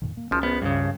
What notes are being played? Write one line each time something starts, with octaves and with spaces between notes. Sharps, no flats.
F2 A#2 D#3
A#3
G#1 C#2 F3 C#4
A#1 B3
G2 C#3